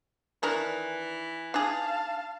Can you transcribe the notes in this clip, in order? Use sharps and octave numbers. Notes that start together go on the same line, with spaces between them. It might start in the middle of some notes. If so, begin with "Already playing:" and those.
D#3 E3 D4 A#4
D4 D#4 G#4 F5 A5